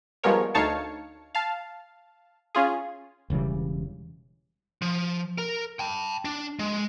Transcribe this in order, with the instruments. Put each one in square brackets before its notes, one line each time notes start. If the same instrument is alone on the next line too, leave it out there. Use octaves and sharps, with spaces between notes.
[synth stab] F3 G3 G#3 B3 A#4 C#5
D2 D#4 C#5 F5 A5 C#7
F5 A5
C#4 F4 G#4
[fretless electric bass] E1 C#3 E3 G3
[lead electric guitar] F3
A#4
G5 A5
D4
G#3